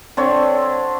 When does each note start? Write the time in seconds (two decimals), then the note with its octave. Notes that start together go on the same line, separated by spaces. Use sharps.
0.17 D3 C4 C#5